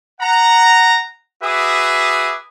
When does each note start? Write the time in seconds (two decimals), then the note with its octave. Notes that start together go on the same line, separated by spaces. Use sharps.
0.21 F#5 A#5
1.42 F#4 G#4 B4 E5 D6 D#6